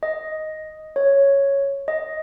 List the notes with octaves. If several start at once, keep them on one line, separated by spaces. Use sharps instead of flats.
D#5
C#5
D#5